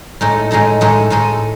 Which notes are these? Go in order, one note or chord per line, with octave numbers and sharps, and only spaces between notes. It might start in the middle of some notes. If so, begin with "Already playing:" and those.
A2 G#3 D#4 A4
A2 G#3 D#4 A4
A2 G#3 D#4 A4
A2 G#3 D#4 A4